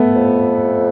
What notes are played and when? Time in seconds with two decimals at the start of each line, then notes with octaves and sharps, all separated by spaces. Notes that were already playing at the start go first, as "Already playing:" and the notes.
Already playing: A3 B3
0.16 F2